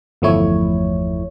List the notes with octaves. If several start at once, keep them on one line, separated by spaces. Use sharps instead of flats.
G1 E2 F3 A3 E4 C#5